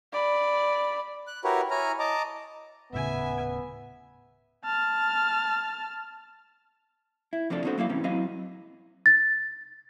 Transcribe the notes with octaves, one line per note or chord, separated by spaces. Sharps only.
D5 B5
F#6
E4 F#4 G4 A#4 B4 C#5
E4 C#5 G#5 A#5 F6
D#5 A5 A#5 D6
D#1 A2 C#3 B3 E5 G#5
A5 F6
E4
F2 C3 F3 D4 A4
B3 C#4 D#4 F#4 A4 C5
F#3 A#3 E4 F5
G#2 C3 E3 C#4
F#3 C4 E4 D#5 F5
A6